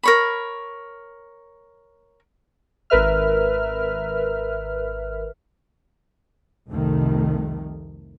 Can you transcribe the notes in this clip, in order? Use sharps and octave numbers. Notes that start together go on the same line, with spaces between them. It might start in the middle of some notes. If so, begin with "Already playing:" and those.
A#4 C#5 B5
G#1 A#4 B4 E5 F6
C2 F2 C3 D#3 A3